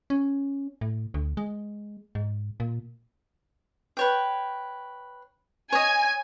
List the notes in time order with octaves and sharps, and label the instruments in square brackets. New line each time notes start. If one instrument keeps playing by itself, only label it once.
[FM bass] C#4
A2
D2
G#3
G#2
A#2
[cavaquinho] B4 C#5 G5
[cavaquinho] C#5 D#5 [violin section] G#5